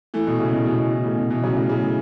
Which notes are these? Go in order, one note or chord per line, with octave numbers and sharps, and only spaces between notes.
E3 A3
B2
A2 C#3
B2 E3
B2
B2
E3
A2 C#3
B2
B2 E3
C#3 F#3
A2 C#3
A2 C#3